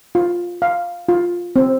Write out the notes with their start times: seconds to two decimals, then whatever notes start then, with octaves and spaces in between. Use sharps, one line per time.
0.15 F4
0.62 F5
1.09 F4
1.56 C4